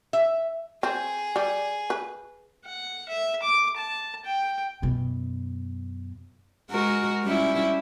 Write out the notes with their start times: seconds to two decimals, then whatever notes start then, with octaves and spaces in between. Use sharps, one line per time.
0.13 E5
0.83 C4 G#4
1.36 G3
1.90 B4
2.66 F#5
3.09 E5
3.42 D6
3.76 A5
4.25 G5
4.82 F#2 B2
6.70 G#3 F#4 A#4
7.23 G3 C#4 E4